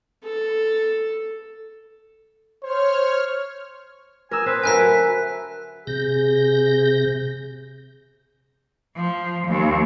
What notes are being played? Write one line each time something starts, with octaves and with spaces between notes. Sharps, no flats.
A4
C5 C#5 F6
A#4 G#5 D#6 E6
C4 B4 C5
D3 F#3 A#4 E5 G#5 B5 F#6 B6
C3 G#4 G6 A#6
F3
D#2